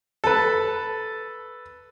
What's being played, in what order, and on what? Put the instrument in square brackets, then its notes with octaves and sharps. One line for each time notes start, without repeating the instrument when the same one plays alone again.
[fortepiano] A4 B4